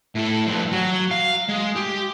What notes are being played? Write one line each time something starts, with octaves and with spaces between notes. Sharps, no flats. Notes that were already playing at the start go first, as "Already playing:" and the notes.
A2 A4
G2 F3
F#3
F5
G#3
G4